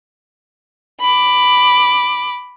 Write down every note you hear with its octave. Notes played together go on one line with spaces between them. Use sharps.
B5 D6